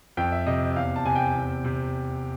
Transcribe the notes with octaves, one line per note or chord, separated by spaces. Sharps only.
F2 G5
E5
C3 D#5
E2 F5
A5
C3 G#5
G5
E2
C3